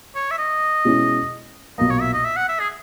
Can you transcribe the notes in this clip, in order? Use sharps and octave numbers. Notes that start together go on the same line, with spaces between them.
C#5
E5
D#5
B2 G#3 C#4 E4
B1 A#2 A#3 D#5
C#5
E5
D#5
E5
F#5
E5
G#4